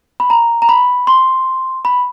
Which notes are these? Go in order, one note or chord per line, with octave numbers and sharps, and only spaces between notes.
B5
A#5
A#5
B5
C6
B5